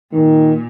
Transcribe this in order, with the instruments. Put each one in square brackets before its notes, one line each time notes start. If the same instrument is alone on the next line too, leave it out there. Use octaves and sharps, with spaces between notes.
[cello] A#2 [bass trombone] D#3